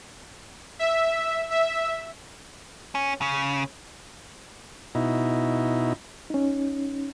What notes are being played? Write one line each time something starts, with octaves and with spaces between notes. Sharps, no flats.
E5
E5
C#4
C#3
B2 D#4 E4
C#4 D#4